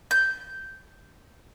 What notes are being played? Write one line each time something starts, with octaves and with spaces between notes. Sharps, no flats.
G6